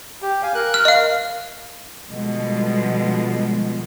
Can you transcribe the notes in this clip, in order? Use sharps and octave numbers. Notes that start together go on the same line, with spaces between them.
G4
F5 G#5
A#4 F#6
F6
D#5 F5
B2 D3 F3 G3 G#3